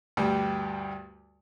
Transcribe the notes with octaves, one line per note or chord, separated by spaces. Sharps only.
D2 G2 G3